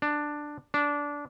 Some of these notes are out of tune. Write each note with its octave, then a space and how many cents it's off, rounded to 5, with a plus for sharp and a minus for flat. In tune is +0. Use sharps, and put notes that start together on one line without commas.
D4 +10
D4 -15